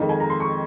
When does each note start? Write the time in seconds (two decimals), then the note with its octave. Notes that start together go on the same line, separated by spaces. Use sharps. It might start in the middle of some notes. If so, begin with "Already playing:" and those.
Already playing: F2 D#3 G#3 D#4
0.09 G#5
0.20 A#5
0.30 C6
0.40 C#6